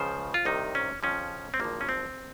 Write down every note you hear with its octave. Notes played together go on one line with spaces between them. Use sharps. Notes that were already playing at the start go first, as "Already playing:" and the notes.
Already playing: C#2 C#3 F3 C5
F4
C2 C3 D#3 D#4
C#4
F2 C#3 F3 C#4
C4
G#1 G2 F3 A#3
C#4
C4